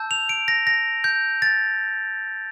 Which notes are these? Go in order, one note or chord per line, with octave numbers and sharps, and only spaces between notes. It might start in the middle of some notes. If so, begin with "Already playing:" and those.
Already playing: A5 E6 G6
F7
D7
A#6
A#6
G6
A6